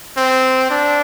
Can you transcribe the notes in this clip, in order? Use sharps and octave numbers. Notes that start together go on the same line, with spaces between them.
C4
D4